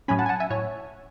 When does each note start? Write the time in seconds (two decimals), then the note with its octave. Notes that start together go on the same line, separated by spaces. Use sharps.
0.08 A2 F#3 C#4 G#5 B5
0.19 F#5 A5
0.26 G#5
0.29 F#5 A5
0.40 E5 G#5
0.50 A2 C#5